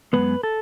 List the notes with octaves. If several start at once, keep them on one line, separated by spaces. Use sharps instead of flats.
F#2 C#3 G#3 B3 B4
A4